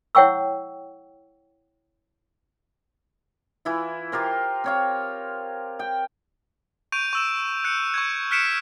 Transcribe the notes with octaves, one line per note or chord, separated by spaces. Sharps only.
E4 C#5 F#5 G5 C#6 E6
E3 E4 F4
F4 G4 A#4 C5
C4 C#5 F5
G5
C#6 G6 D7 D#7 F7
C#6 E6 E7
F#6 G6 C#7
C#6 F#6 G#6
F6 F#6 B6 C#7 D7 E7